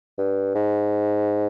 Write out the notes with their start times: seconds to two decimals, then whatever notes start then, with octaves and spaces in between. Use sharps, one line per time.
0.18 G2
0.55 G#2